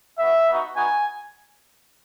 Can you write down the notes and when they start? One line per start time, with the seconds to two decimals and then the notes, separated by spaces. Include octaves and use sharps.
0.18 B3 F#4 E5
0.47 B3 D#4 F#4
0.76 B3 D#4 F#4 G#5